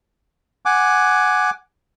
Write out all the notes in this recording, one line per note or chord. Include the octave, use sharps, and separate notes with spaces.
F#5 G#5 D6